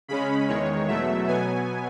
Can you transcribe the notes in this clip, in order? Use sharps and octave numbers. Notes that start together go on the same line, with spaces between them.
C#3 G#3 C#4 B5
E2 D#3 G#3 C#5
E2 B2 F#3 A3 E5
B2 F#3 B3 G#5